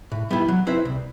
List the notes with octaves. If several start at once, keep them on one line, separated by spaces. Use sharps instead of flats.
A2
G3 B3 E4
F#3
C4 E4 B4 E5
C2